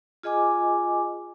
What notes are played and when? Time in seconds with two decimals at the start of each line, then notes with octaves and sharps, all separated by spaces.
0.23 F4 G#4 D#5 G#5 D6